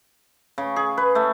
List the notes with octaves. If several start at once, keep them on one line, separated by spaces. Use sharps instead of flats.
C#3
G#4
B4
A3